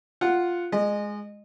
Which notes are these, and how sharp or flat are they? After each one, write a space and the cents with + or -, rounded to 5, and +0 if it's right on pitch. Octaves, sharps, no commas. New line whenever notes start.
F4 +0 F#5 +0
G#3 +0 D#5 -25